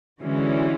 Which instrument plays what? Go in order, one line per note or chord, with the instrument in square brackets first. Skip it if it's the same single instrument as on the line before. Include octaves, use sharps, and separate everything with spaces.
[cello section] D3 E3 [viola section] G#3 C#4 F#4